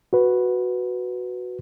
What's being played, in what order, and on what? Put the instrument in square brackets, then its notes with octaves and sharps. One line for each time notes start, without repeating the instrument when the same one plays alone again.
[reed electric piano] F#4 B4